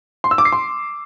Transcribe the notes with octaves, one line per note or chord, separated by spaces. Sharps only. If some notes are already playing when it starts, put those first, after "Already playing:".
C6
E6
D6
C7
C6